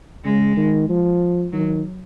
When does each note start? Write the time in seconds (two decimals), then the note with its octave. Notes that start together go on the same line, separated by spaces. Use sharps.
0.24 C#3 G#3
0.57 D#3
0.89 F3
1.52 D#3 F#3